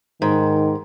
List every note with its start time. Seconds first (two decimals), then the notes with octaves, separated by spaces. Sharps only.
0.22 G#2 D#3